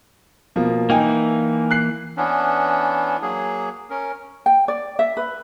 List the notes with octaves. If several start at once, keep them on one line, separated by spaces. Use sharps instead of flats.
B2 F3 A#3
E3 A#3 D#4 G5 G#5
F#6 C7
E3 B3 C#4 D4
F#3 A#3 G#4
C#4 A#4
G5
D5
E5
B4